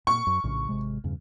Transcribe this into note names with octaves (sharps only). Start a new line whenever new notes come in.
A#2 C#6
F#2
A#1 A2 C#3
G#1 C3 G#3
E2 G2 C#3